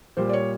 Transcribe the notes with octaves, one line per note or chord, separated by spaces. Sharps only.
A#2 G3 C5
D5
C#5